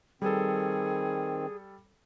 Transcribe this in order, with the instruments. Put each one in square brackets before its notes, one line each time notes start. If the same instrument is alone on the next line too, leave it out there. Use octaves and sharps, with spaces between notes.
[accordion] D#3 C4 [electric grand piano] G3 A4 [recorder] G#4